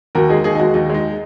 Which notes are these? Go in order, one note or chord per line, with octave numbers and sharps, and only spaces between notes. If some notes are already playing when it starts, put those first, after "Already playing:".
D#2 F#4 A#4
G#3 D#4 G#4
D#2 D#4 G#4
D#4
G#3 F#4
D#2 D#4
G#3 D#4